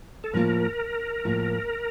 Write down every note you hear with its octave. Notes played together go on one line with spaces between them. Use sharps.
A4
A2 F3 A#3 F4 A#4
A2 F3 A#3 F4